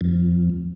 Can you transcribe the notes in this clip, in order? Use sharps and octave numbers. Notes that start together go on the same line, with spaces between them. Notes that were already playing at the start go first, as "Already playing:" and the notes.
F2